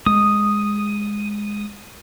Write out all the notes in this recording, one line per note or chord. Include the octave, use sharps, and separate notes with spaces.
G#3 D#6